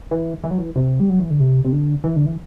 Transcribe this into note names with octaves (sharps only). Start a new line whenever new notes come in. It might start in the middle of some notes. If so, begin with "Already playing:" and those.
E3
E3
F#3
E3
C3
G3
F#3
E3
D3
C3
C3
D3
E3
D3
E3